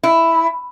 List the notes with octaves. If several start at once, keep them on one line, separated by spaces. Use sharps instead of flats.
E4